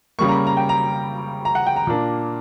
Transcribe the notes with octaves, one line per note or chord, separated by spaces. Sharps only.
C#3 G3 A#3 C#6
A#5
B5
A#5
G5
A#5
A#5
F#5
G5
A#5
A#2 A#3 D4